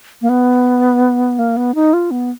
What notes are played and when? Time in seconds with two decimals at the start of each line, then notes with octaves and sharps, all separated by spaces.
0.22 A#3
0.29 B3
1.39 A#3
1.57 B3
1.75 D#4
1.93 F4
2.11 B3